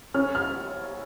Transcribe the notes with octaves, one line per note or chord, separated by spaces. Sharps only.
C#4 F6
F6